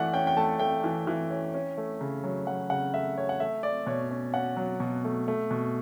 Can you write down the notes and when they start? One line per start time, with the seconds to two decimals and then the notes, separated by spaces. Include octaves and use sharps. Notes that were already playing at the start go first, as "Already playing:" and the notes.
Already playing: E3 A3 D5 F#5
0.13 C#4 G5
0.27 G5
0.37 A3 A5
0.59 A3 G5
0.84 E3
1.07 E3
1.30 C#4
1.54 C#4
1.77 A3
2.01 C#3
2.24 F#3
2.47 F#3 F#5
2.70 C#3 F#5
2.94 A3 E5
3.17 A3 C#5
3.29 F#5
3.40 A3 E5
3.63 A3 D5
3.86 B2 C#5
4.10 C#4
4.34 C#4 F#5
4.57 F#3
4.80 B2
5.04 A3
5.28 A3
5.51 B2